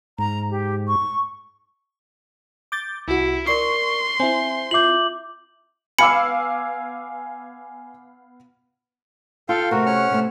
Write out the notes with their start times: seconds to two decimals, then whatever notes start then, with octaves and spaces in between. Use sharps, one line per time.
0.19 G#2 A#5
0.50 G4
0.88 C#6
2.72 D6 G6 A6
3.08 C2 E4 F#4
3.47 A#4 D5 C6 C#6 C7
4.20 C4 E4 E5 G#5
4.71 F4 E5 D6 G6 F#7
5.99 B3 F5 G#5 B5 D6 E6 C#7
9.49 F4 A4 F5 G5
9.71 C3 A3 C4 F#4 A#4
9.86 C#4 F#5 F6
10.10 C3 A3 C4